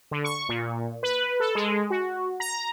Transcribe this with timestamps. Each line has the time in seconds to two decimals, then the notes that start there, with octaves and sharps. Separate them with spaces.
0.11 D3
0.24 C#6
0.49 A#2
1.03 B4
1.40 A4
1.55 G#3
1.90 F#4
2.40 A#5